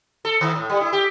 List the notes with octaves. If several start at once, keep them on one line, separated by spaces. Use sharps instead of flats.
A4
D#3
A2
G3
E4
G4